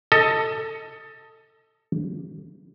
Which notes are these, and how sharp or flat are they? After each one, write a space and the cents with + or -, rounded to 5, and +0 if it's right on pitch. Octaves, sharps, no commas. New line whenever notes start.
A4 +15 D#5 +20